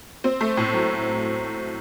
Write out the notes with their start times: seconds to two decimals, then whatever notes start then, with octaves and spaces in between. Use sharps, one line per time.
0.24 C4
0.41 A3
0.57 A2
0.73 F#3